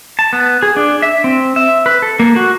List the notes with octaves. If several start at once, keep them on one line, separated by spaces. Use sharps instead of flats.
A5
B3
G#4
D4
E5
C4
E5
B4
A4
A#3
F#4